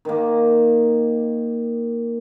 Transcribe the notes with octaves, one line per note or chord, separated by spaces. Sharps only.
D#3 A#3